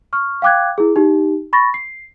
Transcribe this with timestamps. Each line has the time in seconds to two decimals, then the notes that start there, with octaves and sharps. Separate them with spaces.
0.13 C#6 F6
0.42 F5 G5 D6 F#6 G#6
0.78 E4 G#4
0.96 D#4 G4
1.53 B5 C#6 A6 A#6
1.74 C7